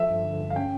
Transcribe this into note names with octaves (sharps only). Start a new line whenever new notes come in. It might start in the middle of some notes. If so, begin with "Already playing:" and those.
Already playing: F3 A4 E5
G2
D3
G2
F5
C#4 G5